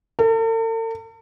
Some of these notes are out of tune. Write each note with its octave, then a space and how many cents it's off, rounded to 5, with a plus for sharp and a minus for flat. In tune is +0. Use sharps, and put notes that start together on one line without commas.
A4 +45